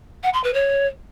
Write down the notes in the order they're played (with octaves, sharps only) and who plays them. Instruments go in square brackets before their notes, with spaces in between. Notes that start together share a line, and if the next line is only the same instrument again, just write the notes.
[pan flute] F#5
C6
B4
C#5